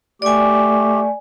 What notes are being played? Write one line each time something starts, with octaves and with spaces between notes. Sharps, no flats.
A3 G4 D5 G#5